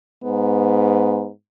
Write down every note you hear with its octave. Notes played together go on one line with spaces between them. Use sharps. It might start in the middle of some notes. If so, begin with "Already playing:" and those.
G#2 B3